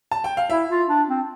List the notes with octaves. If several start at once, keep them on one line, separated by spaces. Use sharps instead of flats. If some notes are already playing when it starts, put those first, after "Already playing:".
A5
G5
F5
E4 E5
F4
D4
C4